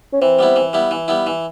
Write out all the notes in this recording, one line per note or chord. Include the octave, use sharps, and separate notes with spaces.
C#4
E3 C4
G3 B3 E4
E3
G3 B3 E4
E3
G3 B3 E4
E3